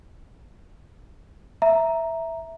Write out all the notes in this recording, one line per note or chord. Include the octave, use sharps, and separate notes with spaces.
E5 A#5